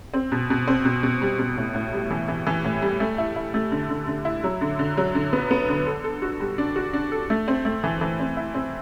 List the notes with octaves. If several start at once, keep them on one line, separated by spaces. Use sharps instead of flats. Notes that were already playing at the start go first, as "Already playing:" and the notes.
C4
B2
B2
C4
B2
B2
G3
B2
A2
A2
G3
E3
E3
E3
A2
G3
A3
E4
E4
A3
D3
D3
D3
E4
F#3
D3
D3
F#3
D3
B3
B3
D3
A4
A4
F#4
G3
D4
F#4
D4
A4
A3
C4
A3
E3
E3
C4
E4
C4